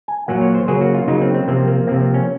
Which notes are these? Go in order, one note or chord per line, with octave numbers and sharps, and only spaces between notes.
G#5
A#2 F#3 A#3 F#5
C#5
C5
C#3 F#3 A#3 G#4
F#4
F4
C#3 F#3 A#3 D#4
C4
C4
C3 F3 A#3 C4
A#3
C3 F3 A#3 C4
C4
C#4